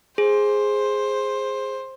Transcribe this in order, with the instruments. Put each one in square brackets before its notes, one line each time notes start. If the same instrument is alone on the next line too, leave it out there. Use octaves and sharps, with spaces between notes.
[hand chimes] G#4 [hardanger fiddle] C5